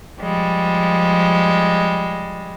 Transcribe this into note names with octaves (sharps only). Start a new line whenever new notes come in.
F3 G3 G#3